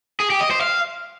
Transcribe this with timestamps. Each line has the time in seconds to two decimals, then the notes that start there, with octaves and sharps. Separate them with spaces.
0.20 G#4
0.30 G4
0.40 D#5
0.51 C5
0.61 F5